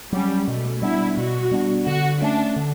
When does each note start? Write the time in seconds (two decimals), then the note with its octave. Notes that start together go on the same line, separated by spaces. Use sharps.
0.12 F#3 G3 C#4
0.47 B2 A3
0.82 G3 B3 D4 E4
1.17 B2 F#4
1.51 G3 B3 D4
1.87 D3 F#4
2.22 A3 C#4 D4
2.56 D3